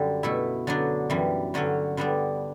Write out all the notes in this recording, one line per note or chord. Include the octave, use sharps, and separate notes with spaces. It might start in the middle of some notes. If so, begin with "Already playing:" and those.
Already playing: F#2 D3 G3 D4
B2 A3 E4
D3 F#3 B3 D4
F#2 E3 G3
G2 D3 F#3 C#4
D3 G3 B3 D4